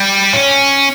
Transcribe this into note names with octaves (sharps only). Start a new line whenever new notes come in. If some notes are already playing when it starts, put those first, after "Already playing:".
Already playing: G3
C#4